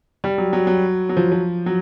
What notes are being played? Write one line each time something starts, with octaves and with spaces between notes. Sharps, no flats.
G3
F#3
F#3
F#3
F#3
F3
F3
F#3